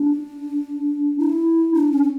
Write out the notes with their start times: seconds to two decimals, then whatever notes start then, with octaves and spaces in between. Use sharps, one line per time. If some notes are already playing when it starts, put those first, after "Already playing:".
Already playing: D4
1.19 E4
1.74 D4
1.93 C#4